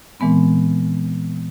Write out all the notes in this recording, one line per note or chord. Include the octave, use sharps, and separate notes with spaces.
A#2 E3 G#3 B3 C4